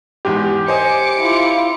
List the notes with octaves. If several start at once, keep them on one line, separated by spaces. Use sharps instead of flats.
E2 G#2 G4
C5 D#5 G#5 D6 C#7
E4 F4